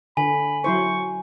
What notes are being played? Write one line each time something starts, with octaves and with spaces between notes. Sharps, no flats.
D3 G#5 B5
F#3 E4 C5 C#6